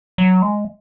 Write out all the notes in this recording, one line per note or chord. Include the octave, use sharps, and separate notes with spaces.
F#3
G#3